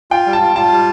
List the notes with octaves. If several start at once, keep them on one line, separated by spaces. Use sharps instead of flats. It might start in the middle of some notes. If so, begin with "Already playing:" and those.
F4 G5
G3
A5
F4
F4 A5
G3